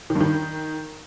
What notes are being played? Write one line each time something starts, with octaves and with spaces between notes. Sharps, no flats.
D#3
G2
D#3